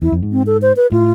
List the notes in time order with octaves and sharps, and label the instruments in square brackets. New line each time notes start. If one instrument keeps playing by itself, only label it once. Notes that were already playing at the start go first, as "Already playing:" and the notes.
[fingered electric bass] E2 [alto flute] E4
[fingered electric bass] F2
G#2
[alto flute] C4
A4
C5
B4
[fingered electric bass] A2 [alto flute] F4